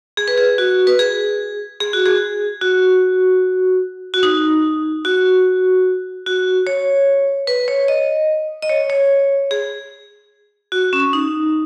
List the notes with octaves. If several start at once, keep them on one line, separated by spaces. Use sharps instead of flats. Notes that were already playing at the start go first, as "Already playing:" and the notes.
G#4
B4
G#4
F#4
B4
G#4
G#4
F#4
G#4
F#4
F#4
D#4
F#4
F#4
C#5
B4
C#5
D#5
D#5
C#5
C#5
G#4
F#4
C#4
D#4